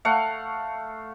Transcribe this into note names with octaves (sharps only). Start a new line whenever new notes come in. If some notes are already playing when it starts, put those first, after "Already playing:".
A3 F5 F#5